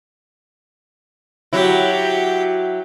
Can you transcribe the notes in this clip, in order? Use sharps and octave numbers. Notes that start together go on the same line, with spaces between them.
F#3 E4 G4